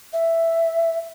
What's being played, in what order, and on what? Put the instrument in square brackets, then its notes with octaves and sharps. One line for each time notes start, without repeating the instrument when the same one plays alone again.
[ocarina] E5